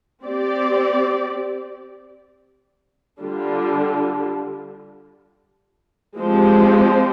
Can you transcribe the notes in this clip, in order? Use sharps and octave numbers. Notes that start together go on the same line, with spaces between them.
C4 G4 D5
D3 G3 D4 F4
F3 G#3 C4 G4 C5